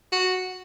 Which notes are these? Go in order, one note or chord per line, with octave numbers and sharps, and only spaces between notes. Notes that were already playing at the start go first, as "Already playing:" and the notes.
F#4